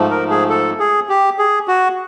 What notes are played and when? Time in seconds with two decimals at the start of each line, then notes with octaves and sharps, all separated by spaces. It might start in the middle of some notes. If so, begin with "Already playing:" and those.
Already playing: G#2 F3 A3
0.11 A#4
0.30 G#4
0.50 A4
0.79 G#4
1.09 G4
1.38 G#4
1.68 F#4